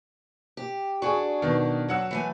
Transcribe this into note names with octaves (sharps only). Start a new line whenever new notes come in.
G4
D4 F#4 G#4 G#5 C#6
B2 D#3
F#3 F#5 E6
E3 A3 G#5